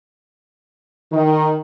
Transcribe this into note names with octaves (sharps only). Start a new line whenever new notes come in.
D#3